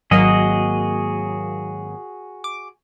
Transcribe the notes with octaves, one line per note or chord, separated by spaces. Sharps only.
G#1 F#3 A#3 F#4 G#4 D#5
D6